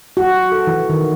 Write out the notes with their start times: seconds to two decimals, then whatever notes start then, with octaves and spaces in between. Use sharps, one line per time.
0.17 F#4
0.52 A4
0.67 E3
0.90 D#3